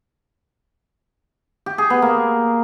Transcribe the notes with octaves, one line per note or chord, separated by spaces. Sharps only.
G4
G#4
B3
A#3